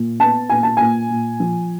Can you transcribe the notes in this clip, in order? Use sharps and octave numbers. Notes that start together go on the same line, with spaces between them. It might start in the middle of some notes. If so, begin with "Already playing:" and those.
Already playing: A#2
B3 A5
A#2 G#5
A5
A#2 G#5
A#2
F3